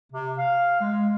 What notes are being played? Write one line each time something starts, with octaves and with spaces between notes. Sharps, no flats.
C3
F5
G#3